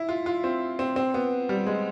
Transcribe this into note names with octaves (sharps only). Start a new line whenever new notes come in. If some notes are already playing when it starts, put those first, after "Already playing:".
Already playing: E4
F4
F4
C4
C4
C4
B3
G3
G#3